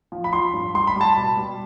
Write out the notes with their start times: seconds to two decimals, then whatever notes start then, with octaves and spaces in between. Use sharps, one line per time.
0.12 F3
0.24 B5
0.33 F3 C6
0.53 G2
0.74 G3 C6
0.87 B5
0.96 G3
1.01 A5
1.14 B2 B5
1.37 G3